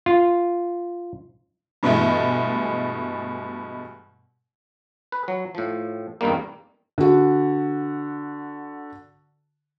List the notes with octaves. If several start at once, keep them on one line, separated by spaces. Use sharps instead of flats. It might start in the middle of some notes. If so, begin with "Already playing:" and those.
F4
G2 B2 E3 G#3 A3
B4
F#3
A2 F3
E2 G2 D#3 G3 A#3
D3 F#4